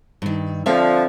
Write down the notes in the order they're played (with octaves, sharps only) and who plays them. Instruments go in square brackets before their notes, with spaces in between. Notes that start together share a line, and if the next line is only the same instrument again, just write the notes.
[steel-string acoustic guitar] G2 D#3
[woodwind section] D3 F3 [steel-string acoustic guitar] C4 E5 F5